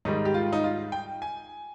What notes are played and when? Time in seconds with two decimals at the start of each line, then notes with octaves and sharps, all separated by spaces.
0.05 G#2 D#3 G3 D#4
0.25 G4
0.34 F4
0.53 D#4
0.64 F4
0.92 G5
1.22 G#5